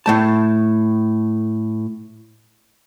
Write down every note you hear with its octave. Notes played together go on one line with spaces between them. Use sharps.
A2 A3 A5